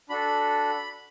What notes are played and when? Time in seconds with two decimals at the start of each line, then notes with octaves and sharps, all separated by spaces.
0.09 D4 F#4 A4 B5